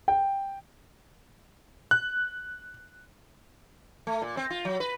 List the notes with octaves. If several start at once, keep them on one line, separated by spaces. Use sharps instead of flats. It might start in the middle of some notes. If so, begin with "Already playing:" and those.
G5
F#6
A3
A#2
C4
F4
F#3
B4